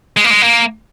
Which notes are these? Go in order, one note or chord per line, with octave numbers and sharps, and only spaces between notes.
G#3
A#3
G#3
A#3